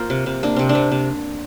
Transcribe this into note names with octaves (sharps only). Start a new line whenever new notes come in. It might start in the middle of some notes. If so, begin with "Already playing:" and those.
Already playing: A#3 F4 A#4 C5
C3
C3
A#3 D4
C3 C4
D4
C3
C3